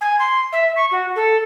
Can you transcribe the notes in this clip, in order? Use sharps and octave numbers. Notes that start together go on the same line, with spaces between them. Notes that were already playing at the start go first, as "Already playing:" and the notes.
G#5
C6
E5
C#6
F#4
A4